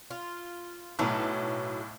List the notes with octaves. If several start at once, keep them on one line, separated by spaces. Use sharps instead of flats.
F4
B1 A2 F#3 A4 B4